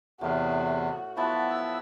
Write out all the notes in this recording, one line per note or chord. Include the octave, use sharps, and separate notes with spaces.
E2 A2 C3 F#4 F5
F3 F#3 B3 E4 A5
E6